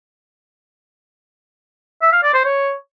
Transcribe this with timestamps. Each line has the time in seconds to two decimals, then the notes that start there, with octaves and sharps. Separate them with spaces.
2.02 E5
2.13 F5
2.23 D5
2.34 C5
2.44 C#5